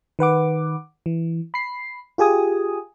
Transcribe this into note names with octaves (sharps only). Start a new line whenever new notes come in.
D#3 B4 F#5 D6
E3
B5 C7
F4 G4 G#4 G#5 D#6